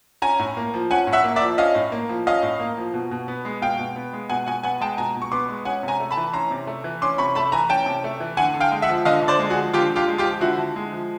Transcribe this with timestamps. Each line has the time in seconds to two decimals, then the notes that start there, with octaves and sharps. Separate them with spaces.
0.22 C#4 G#5 A#5
0.39 A2
0.57 A#3
0.74 F3
0.90 C#4 F#5 G#5
1.07 A2
1.13 E5 F#5
1.24 A#3
1.36 D5 E5
1.42 F3
1.58 C#4 D#5 F5
1.75 A2
1.92 A#3
2.09 F3
2.27 C#4 D#5 F5
2.43 A2
2.60 A#3
2.78 F3
2.94 B2
3.11 B2
3.28 B3
3.45 G#3
3.62 B2 F5 G5
3.79 B2
3.96 B3
4.13 G#3
4.29 B2 F#5 G#5
4.46 B2 F#5 G#5
4.63 B3 F#5 G#5
4.80 G#3 G5 A5
4.98 B2 G#5 A#5
5.15 B2
5.22 C#6
5.32 B3 C6 D6
5.49 G#3
5.65 C#4 F#5 G#5
5.83 C3
5.88 G#5 A#5
6.00 A3
6.11 A5 B5
6.17 E3
6.33 C#4 A#5 C6
6.51 C3
6.67 A3
6.84 E3
7.02 C#4 C6 D6
7.18 C3 B5 C#6
7.35 A3 A5 B5
7.52 E3 G#5 A#5
7.69 C#4 G5 A5
7.86 C3
8.04 A3
8.20 E3
8.37 D3 F#5 G#5
8.54 D3
8.60 F5 G5
8.72 G#3
8.82 E5 F#5
8.89 F3
9.05 D3 D#5 F5
9.23 D3
9.28 C5 D5
9.39 G#3
9.50 F#4 G#4
9.56 F3
9.73 D3 F4 G4
9.90 D3
9.96 F4 G4
10.08 G#3
10.18 F4 G4
10.25 F3
10.41 D3 E4 F#4
10.58 D3
10.76 G#3
10.93 F3